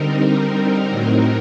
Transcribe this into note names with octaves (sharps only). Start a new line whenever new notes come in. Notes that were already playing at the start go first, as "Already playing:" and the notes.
Already playing: D3 G3 C4 D#4 A#4
A#4
A2 F#3 C4 D#4